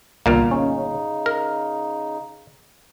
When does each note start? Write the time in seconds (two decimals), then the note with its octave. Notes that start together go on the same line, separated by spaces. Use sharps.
0.26 G1 C2 A#2 A#3 F6
0.51 C#3 C#4 D#4
1.26 A#4